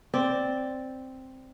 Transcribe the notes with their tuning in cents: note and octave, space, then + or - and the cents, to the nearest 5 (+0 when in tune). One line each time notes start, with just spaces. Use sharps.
C4 +0 D5 +0